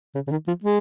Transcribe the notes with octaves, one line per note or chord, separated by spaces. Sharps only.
C#3
C#3
D#3
F3
G#3